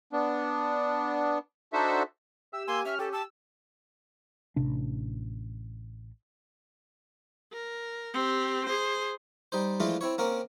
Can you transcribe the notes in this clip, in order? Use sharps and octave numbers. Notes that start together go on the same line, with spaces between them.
B3 D4
D4 D#4 F#4 A4 C5 E5
G4 E5 E6
A#3 G#5 C6
C#4 E5 F6
G4 A4
A5 E6
A1 C3 D4
A#4
C4 G4
G#4 C5
G3 D#4 C5
E3 F3 G#3 A3 D4 F4
C4 E4 C#5
A#3 C4 C#4 A#4